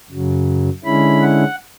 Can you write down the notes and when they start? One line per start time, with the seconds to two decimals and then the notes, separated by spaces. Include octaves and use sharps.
0.10 F#2 C#3 F#3
0.84 D3 G#3 C#4 E4 B5
1.21 F#5